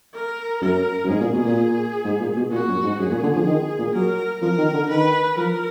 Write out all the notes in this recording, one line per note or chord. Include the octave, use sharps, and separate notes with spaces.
A#4
F#2 A#4
F#2
G#2 G#4
A#2
B2
A#2
G#2
A#2
B2
A#2 F#4
F#2
G#2
F#2 G#4
A#2
D3
F3
D#3
A#2
F#3 A#4
F3 A#4
D#3
D3
D#3 B4
F3 A#4